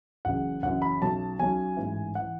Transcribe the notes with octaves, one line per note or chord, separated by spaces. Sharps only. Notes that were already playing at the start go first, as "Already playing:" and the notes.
F#1 F#2 C#3 E3 F#5
F#1 F#2 C#3 E3 F#5
B5
B1 B2 F#3 C#4 A5
B1 B2 F#3 C#4 G#5
A1 G#2 E3
E3 F#5